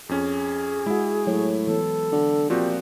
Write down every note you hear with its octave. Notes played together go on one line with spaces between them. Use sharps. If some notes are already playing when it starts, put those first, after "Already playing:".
F2 C#4 G#4
G#3 E4 F#4
A2 F#3 C#5
E3 B3 A4
D3
A#2 F3 C4 F#4 G4